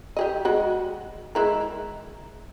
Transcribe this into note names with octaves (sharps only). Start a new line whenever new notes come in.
G4 G#4 D#5
G#3 F#4
G#3 E4 A#4